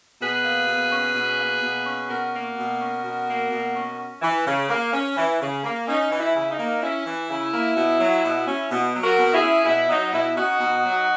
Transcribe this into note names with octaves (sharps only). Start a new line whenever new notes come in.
B2 G#4 B4
A#3
B2
C#4
B2
A#3
B2
C#4
B2 F#4 A#4
A#3
B2
C#4
B2
A#3
B2
C#4
C#4
E3
C#3
A#3
C#4
E3
C#3
A#3
C#4 D#4
E3
E4
C#3
D#4
A#3
C#4 E4
E3
C#3
A#3
B2
F#3
B2
C#4
B2
F#3
F#4 A#4
B2
E4 G#4
C#4
B2 E4
F#3 D#4
B2 E4
C#4 D#4 F#4
B2
F#3